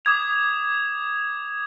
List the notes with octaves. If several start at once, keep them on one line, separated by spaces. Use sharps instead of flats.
D6 D#6 G#6 F7